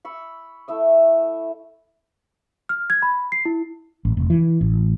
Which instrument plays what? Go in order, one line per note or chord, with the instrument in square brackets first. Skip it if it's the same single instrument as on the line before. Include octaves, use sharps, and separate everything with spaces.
[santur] B5 C#6 E6
A3 E4 E5 D#6
[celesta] F6
G#6
B5
C7
E4
[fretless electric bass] A1
F1
E3
A1